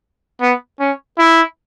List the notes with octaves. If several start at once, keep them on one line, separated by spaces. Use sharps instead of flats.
B3
C#4
E4